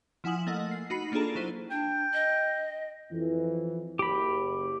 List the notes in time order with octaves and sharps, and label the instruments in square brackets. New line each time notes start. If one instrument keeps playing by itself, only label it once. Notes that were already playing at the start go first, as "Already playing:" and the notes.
[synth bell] F3 E4 F#5 G#5 D#6 F#7
A3 A#3 D#5 F#5
C7
D#4 F#4 B5 C7
A#3 D4 F4 G#4 A4 A#5
F#3 E4 C5 D#7
[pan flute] D4 [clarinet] G5
[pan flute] D#5
[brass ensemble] F2 E3
[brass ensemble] F#1 [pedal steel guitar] G4 B5